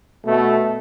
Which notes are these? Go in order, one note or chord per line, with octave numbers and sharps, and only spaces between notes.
B2 A3